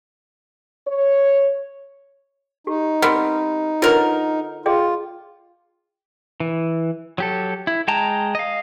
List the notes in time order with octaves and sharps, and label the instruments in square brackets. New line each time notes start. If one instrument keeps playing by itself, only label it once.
[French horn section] C#5
[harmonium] D#4 [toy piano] G4
[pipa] G3 B3 C4 [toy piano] A#4 B5
[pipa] D3 A#4 [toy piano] F4 B4 C#5
[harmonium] F4 [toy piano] G#4 D#5 G5
[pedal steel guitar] E3
F#3 G4 A4
E4
G#3 G5 A5 A#5
D#5 F5